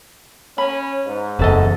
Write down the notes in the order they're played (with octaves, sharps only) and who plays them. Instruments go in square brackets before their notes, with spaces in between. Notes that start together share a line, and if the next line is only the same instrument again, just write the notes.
[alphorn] C#4 [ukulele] B5
[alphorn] G#2
[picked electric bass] F#1 E2 [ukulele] C#4 A4 D#5